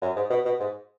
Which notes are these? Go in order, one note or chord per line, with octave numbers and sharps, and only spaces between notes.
F#2
G#2
B2
B2
G#2